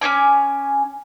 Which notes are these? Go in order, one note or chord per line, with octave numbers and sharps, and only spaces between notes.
C#4 D#4 G#5 D6